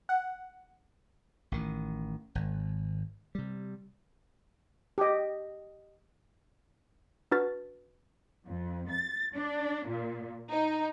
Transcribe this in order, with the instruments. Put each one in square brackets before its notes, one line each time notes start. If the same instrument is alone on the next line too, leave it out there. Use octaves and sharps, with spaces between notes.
[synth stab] F#5
[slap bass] A1 D#3
G#1
C3 G3
[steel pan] G4 D#5
[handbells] D4 F#4 B4 C#6 F6 A6
[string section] F2
A6
D4
A#2
D#4